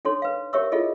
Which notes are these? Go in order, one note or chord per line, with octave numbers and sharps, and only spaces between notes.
D4 D#4 A4 C#5 C6
B4 F5
G4 A#4 C#5 E5 C#6 E6
E4 F4 G#4 A4 D#5